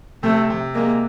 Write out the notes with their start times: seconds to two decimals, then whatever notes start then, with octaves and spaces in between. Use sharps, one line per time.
0.23 C3 A3
0.50 C3
0.75 G#3 A#3